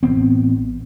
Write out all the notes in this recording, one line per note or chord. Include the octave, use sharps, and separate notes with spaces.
A1 F3 B3 C4